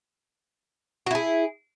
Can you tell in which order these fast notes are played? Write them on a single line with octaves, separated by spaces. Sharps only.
F#4 E4 G#4